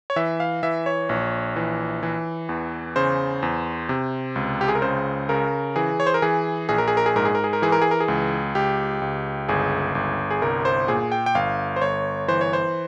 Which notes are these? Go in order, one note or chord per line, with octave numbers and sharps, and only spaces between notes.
C#5
E3 E5
F5
E3 E5
C#5
A#1
E3
E3
E2
C#3 C5
E2
C3
C#2
G4
G#4
A#4
C#3 C5
C#3 A#4
E3 G#4
C#5
C5
A#4
E3 G#4
A#1 G#4
A#4
G#4
A#4
G#4
G#2 A#4
G#4
A#4
G#4
A#4
E3 G#4
A#4
G#4
A#4
G#4
C#2
C#2 G4
C#2
G1 G#4
G1
G#4
C2 A#4
C5
A#2 G#4
G5
G5
G1 F5
C5
G1 C#5
E3 C5
C#5
C5